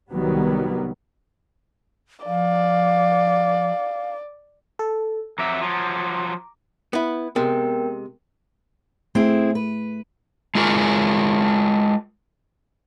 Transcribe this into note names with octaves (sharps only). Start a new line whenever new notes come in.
C2 D#3 F#3 G3 B3
F3 D5 F5
A4
F2 F#3 E5 A#5 D6
F3 F#3
B3 E4
C3 G#3 B3 A#4 G5
A3 C4 E4 G#4
B4
G#3 F4 G#4 A#4